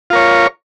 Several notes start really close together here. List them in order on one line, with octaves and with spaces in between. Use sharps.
F4 A#4 C#5